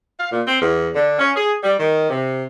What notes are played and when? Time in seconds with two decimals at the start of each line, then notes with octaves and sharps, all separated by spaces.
0.20 F5
0.32 A#2
0.47 C4
0.62 E2
0.95 D3
1.19 C#4
1.36 G#4
1.64 G3
1.80 D#3
2.10 C3